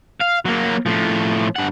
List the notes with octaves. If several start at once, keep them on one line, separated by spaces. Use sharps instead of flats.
F5
F#3 A#3
A2 F3
G2 F#5